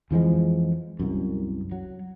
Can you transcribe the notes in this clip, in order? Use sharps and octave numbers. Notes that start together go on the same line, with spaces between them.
F2 E3 F3 G#3
C2 F#2
F#3